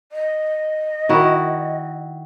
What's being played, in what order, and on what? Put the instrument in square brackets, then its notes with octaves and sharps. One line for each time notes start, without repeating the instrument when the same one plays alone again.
[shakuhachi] D#5
[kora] D#3 E4 F#4